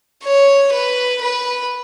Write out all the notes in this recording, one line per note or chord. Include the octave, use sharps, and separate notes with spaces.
C#5
B4
B4